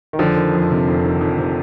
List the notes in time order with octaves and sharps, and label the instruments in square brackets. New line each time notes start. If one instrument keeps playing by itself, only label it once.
[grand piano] D#3
[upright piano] F1 [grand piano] D3 F3
[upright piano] D#3
F2
C3
F1
D#3
F2
C3